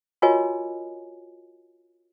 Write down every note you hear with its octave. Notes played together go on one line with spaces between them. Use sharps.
F4 F#4 A#4 C#5 D#5 G#5